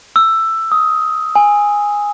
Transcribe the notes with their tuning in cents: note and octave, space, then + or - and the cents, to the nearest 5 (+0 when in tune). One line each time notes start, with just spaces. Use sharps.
E6 +10
D#6 +15
G#5 -10